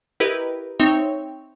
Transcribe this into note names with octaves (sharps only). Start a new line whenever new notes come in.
E4 G4 A#4 B4 D#5
C4 D#4 C#5 E5 G5